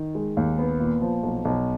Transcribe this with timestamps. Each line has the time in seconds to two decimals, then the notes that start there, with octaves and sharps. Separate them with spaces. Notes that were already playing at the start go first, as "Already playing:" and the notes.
Already playing: D#3
0.15 G#3
0.37 D#2
0.58 B3
0.80 A#2
1.01 F3
1.23 B1
1.45 B1